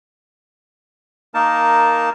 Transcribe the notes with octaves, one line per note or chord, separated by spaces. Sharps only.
A#3 D#4 A#4 A5